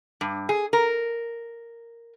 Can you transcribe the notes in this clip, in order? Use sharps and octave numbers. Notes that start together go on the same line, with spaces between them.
G2
G#4
A#4